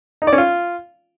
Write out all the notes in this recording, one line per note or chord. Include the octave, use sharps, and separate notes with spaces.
D#4
D5
C#4
F4